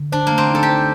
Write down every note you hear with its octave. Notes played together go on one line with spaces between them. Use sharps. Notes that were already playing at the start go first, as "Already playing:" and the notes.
Already playing: D3
D4 C5
A3 A#3
C4
D#4 A4
G4
C5